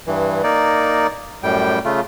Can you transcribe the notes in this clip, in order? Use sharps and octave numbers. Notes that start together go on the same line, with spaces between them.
G2 E3
A#3 D#4 D5
F#2 A2 G3 G5
C#3 A3 F4